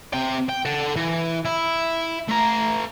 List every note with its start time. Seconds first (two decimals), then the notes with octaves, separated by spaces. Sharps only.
0.14 C3 G5
0.49 G5
0.65 A4 F#5
0.96 E3
1.45 E4
2.28 A3 A#5